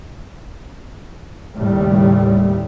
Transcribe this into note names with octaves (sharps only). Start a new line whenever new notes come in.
D#2 A2 C#3 G3